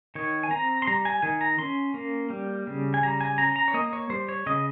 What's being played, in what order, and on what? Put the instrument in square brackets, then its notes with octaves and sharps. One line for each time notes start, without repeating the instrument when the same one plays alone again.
[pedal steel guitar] D#3 C#5
G#5
C4 A#5
C6
G3 A#5
G#5
D#3 G#5
A#5
C#4 C6
A#3
G3
C#3
G#5
G3 A#5
G#5
C#4 A#5
A#5
C#5
A#3 D#5
C#5
G3 C5
C#5
C#3 D#5